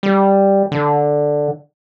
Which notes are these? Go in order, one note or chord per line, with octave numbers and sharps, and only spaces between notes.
G3
D3